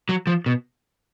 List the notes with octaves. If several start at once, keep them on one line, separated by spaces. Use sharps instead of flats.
F#3
F3
B2